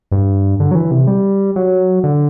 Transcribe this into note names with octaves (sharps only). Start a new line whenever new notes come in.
G2
D3
F#3
E3
C3
G3
F#3
D3